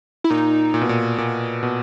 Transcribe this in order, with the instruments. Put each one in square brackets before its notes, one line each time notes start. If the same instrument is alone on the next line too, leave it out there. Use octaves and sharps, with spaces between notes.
[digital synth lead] E4
[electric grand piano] A#2 [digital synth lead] D#4
[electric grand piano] A#2
B2
A#2
A#2
B2